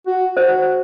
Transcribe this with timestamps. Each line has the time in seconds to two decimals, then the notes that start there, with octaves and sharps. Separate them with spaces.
0.07 F#4
0.37 F#4 C5